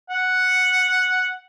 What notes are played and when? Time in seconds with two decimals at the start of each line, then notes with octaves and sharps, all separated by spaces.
0.10 F#5